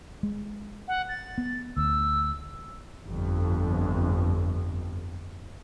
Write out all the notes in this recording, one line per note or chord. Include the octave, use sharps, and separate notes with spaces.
G#3
F#5
A6
B3
D2 E6
G1 F2